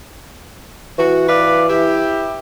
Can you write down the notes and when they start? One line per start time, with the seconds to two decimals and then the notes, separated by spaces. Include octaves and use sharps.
0.99 E3 F#4
1.29 B4 D5 F5
1.69 E4 G4